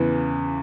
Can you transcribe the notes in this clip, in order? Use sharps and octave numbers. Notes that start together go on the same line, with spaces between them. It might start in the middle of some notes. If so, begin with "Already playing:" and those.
Already playing: E2 C#3 E3 B3 B4